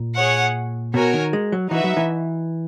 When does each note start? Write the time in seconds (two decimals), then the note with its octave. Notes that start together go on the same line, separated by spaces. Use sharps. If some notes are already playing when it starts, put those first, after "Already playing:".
Already playing: A#2
0.16 G#4 C#5 F#5
0.94 B2 F#4 A#4 C#5 G#5
1.14 D#3
1.33 G#3
1.52 F#3
1.71 E3 D#4 F#4 B4 E5
1.84 F#3
1.97 E3